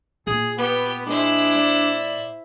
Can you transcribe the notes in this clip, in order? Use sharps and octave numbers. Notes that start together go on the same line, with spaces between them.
A#2 G#4
B3 G4 B4
G#3 D4 E4 C5
D5